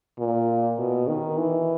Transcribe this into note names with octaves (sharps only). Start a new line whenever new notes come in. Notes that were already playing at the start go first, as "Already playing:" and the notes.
A#2
B2
D#3
E3